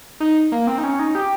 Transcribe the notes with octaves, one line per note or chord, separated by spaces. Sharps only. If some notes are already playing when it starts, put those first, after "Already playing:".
D#4
A#3
C4
D#4
C#4
D#4
G4